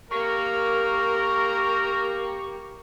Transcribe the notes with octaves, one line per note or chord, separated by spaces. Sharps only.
A#3 G4 A#4 C#6